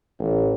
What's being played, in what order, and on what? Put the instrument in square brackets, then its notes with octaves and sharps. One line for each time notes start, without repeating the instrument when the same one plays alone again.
[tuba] A1